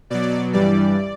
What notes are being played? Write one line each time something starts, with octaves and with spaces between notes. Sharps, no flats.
B2 F#3 D5
G2 E3 G3 D5